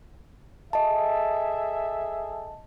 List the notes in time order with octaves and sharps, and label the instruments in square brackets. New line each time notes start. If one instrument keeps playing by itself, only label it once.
[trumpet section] G#4 A4 E5 [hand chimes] D#5 A5